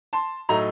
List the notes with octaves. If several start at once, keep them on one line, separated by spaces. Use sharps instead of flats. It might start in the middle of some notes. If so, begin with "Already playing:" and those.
A5 C6
A2 F#3 A3 D#4 A#5